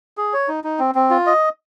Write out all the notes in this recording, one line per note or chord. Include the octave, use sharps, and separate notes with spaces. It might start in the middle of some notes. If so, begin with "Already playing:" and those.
G#4
C#5
D#4
D#4
C4
C4
F4
D#5